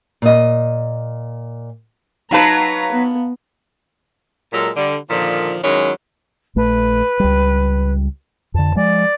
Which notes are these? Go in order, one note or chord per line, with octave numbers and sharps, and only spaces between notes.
A#2 D#5
F#3 D#4 B4 F5 A5 A#5
B3
A#2 F#3 G#3 A4 A#4
D3 G3
A#2 D3 D#3 F3
D#3 F#3 G#3 C#4 E4
A#1 A3 B4
C#2 G3
F2 D3 A5
F3 G#3 D5